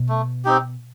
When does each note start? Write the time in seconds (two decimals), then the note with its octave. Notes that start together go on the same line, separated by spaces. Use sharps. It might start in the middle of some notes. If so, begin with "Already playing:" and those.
Already playing: B2
0.09 A3
0.45 C4 D#4 G4